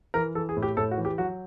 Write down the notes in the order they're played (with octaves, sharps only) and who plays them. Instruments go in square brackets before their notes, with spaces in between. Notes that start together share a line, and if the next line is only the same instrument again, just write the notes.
[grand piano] E3 A#4
E3 A4
G#4
A2
G4
A2 A4
F#4
E3
G4
F#3 F#4